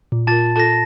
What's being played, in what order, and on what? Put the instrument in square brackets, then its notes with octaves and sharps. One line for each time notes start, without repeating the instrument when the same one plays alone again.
[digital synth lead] A#2
[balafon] F4 A#4 [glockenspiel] A5 A6
[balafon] F4 A4 [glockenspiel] A5 A#6